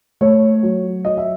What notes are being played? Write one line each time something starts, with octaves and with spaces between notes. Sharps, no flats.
A3 C#5
F#3
F#3 D#5
E5